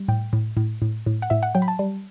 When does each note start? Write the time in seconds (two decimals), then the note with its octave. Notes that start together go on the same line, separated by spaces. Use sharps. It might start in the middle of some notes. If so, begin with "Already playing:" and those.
Already playing: G3
0.08 A2 G5
0.33 A2
0.57 A2
0.82 A2
1.06 A2
1.22 F#5
1.30 A2 E5
1.43 F#5
1.55 F#3 G5
1.62 B5
1.68 A5
1.79 G3